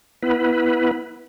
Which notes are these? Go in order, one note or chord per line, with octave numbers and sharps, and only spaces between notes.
B3 E4 B4